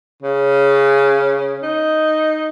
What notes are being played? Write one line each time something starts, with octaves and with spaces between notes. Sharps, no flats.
C#3
D#4